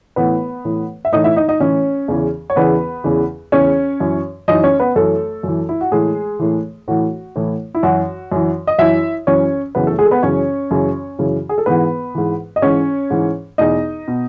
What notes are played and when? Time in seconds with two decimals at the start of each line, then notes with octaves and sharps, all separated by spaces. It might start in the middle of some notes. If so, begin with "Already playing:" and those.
0.16 A2 E3 B3 B4
0.65 A2 E3
1.05 E5
1.13 A2 E3 D#4 D#5
1.24 E4 E5
1.36 D#4 D#5
1.48 D#4 D#5
1.60 A2 E3 C#4 C#5
2.08 E2 C#3 E3
2.50 C#5
2.56 E2 C#3 E3 B3 B4
3.04 E2 C#3 E3
3.52 E2 C#3 E3 C#4 C#5
4.00 F#2 E3
4.48 F#2 E3 D#4 D#5
4.63 C#4 C#5
4.80 B3 B4
4.96 F#2 E3 A3 A4
5.43 F#2 E3
5.69 E4
5.81 F#4
5.92 A2 E3 G#3 G#4
6.39 A2 E3
6.88 A2 E3 F#4
7.36 A2 E3
7.75 E4
7.83 F#2 E3 F#4
8.32 F#2 E3
8.67 D#5
8.79 F#2 E3 E4 E5
9.27 F#2 E3 C#4 C#5
9.75 F#2 C#3 E3 B3 B4
9.87 A3 A4
9.99 G#3 G#4
10.05 A4
10.11 B3 B4
10.23 F#2 C#3 E3 C#4 C#5
10.71 F#2 C#3 E3
11.19 F#2 C#3 E3
11.49 G#4
11.58 A4
11.66 G#2 E3 B3 B4
12.15 G#2 E3
12.56 D#5
12.62 G#2 E3 C#4 C#5
13.10 G#2 E3
13.58 E2 B2 D#4 D#5
14.08 B2